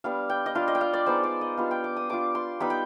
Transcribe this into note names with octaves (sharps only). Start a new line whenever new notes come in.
G3 B3 D4 F5
G5
D#5
G3 D4 F4 F5
D#5
G5
F5
D5
G#3 B3 D#4 C5
D5
D#5
G3 B3 D4 F4 F5
G5
D6
D#6
G3 D4 F4 D6
C6
G3 B3 D#4 B5
G5